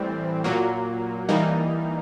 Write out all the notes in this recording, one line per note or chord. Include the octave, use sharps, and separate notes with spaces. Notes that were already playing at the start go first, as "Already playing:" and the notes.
Already playing: A2 E3 G3 C4
A#2 F#3 A#3
E3 G3 A#3 D#4